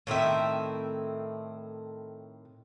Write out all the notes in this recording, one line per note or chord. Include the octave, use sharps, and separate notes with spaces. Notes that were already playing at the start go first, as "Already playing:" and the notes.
A2 D#3 C4 E5